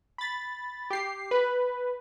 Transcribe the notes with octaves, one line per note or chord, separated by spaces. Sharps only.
B5 A6
G4 C7
B4